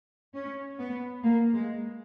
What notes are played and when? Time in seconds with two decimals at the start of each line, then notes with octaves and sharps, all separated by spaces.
0.34 C#4
0.79 B3
1.23 A#3
1.54 G#3